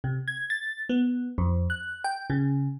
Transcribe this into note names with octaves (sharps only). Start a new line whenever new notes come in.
C3
G#6
A6
B3
F2
F#6
G5
C#3